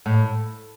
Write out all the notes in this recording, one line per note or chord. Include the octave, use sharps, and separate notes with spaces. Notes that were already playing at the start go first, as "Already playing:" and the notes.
A2